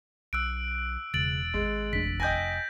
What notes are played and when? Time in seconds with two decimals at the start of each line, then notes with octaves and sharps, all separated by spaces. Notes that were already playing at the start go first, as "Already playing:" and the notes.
0.33 B1 E6 F#6 D7
1.14 E1 C#3 A6 D7 F#7
1.54 G#1 G#3
1.93 F1 D4 B6
2.20 D#5 G5 G#5 G6 A#6